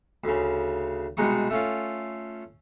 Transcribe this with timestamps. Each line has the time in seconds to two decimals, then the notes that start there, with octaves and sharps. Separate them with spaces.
0.24 D2 C#3
1.17 C2 B2 G#3 D#4 C#6
1.50 A3 C#4 F4